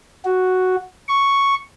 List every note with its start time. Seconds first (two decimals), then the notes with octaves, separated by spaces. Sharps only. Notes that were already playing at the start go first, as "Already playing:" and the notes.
0.25 F#4
1.09 C#6